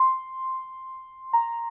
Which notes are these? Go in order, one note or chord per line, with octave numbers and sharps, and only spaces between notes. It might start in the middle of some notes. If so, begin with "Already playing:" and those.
Already playing: C6
A#5